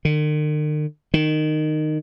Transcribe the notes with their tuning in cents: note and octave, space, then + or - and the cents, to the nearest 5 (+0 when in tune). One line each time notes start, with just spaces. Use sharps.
D#3 -45
D#3 -15